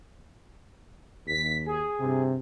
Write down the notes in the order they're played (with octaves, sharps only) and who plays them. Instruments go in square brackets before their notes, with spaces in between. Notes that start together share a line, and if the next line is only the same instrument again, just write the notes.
[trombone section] D#2 [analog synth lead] B6
[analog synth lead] G#4
[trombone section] G2 C3